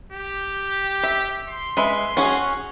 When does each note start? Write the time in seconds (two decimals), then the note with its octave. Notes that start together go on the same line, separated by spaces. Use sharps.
0.12 G4
1.03 E5
1.48 C6
1.77 G#3 B4 E5
2.17 C#4 F#4 G#4